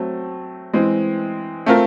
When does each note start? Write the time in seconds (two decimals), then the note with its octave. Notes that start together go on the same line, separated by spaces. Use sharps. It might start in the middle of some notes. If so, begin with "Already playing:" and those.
Already playing: F#3 A3 C4
0.73 E3 G#3 C4
1.66 A3 C4 F4 A#4